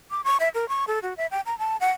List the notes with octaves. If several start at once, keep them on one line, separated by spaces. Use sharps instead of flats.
D6
C#6
E5
A#4
C#6
A4
F#4
E5
G5
A#5
A5
F#5